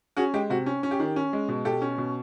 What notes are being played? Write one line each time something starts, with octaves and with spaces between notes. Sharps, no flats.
C#4 F#4 G#4
G#3 G4
C3 F#4
C#4
C#4
G4
D#3
C#4
G#3
B2
B2 G4 A4
C#4
B2